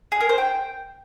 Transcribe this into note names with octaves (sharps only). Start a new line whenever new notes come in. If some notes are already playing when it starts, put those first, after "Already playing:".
G#4
A#4
C5
G5